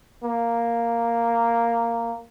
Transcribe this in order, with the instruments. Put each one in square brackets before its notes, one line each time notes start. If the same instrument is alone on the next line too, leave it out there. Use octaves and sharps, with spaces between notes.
[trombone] A#3